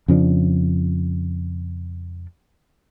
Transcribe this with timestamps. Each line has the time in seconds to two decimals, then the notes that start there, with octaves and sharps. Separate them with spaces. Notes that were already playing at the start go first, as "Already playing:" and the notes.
0.08 F2 C#3 F3 D4